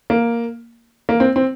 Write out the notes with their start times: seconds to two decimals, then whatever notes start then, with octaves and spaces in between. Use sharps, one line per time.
0.10 A#3
1.09 A#3
1.20 C4
1.36 C4